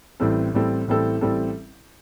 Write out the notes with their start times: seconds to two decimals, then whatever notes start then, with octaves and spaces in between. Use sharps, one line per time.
0.20 A1 A2 G3 C4 A4
0.54 A1 A2 G3 C4 A4
0.87 A1 A2 G3 C4 A4
1.21 A1 A2 G3 C4 A4